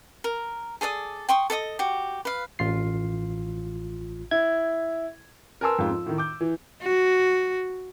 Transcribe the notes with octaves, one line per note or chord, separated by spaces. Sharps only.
A#4
G#4 A4 D5 D#6
G5 C6 C#6 D#6
A4 D5 D#5 D#6
F#4 G4
B4 F5
A1 F4 C7
E4 G#6
A#4 B4 G#5 A5 C6 E6
F2 G#2 F4
F3
A2 D#3
D6 G6
E3
F#4